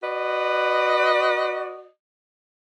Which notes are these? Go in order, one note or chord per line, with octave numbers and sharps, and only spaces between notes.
F#4 B4 D5 D#5